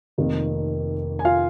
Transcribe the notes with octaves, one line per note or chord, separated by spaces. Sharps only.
F1 F2 D#3 A#3
G#5
F4 F5